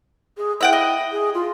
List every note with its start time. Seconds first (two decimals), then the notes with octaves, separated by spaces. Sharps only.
0.37 G#4
0.61 E4 E5 F#5 G5
0.73 D#5
1.12 G#4
1.34 F4